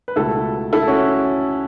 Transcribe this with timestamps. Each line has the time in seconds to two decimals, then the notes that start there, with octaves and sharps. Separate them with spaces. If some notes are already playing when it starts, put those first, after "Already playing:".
0.08 B4
0.16 C#2 B2 A3 E4 A4
0.73 E4 A4
0.88 C#4 F#4